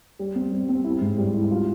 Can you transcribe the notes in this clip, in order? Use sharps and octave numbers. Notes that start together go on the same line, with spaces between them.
G3
C4
G3
C4
E4
G#2
G3
E4
F4